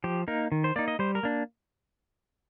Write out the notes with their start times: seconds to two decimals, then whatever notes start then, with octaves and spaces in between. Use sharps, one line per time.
0.04 F3 G4
0.28 A#3 D#4 A#4
0.52 D#3
0.64 C5
0.76 A#3 D#4 D5
0.88 D#5
0.99 G3 C5
1.15 A#4
1.23 A#3 D4